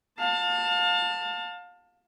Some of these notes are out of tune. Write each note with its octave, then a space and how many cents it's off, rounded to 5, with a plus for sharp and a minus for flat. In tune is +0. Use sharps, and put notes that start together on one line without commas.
F5 +30 A5 +20